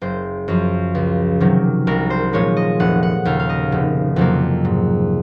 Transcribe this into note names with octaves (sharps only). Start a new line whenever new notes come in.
F#1 C5
F#2 F3
C#2
C3 D#3 F#3
C2 A#4
C5
A#2 F3 G#3 C#5
D#5
F1 F#5
F#5
D#2 C#3 F5
F5
D#5
F1
F2 C3 F#3 A#3
G#2